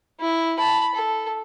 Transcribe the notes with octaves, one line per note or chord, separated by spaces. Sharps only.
E4
A5 B5
A4